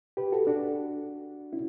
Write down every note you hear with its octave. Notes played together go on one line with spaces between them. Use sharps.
G4 B4
F#4 A4
D4 F#4
C#4 E4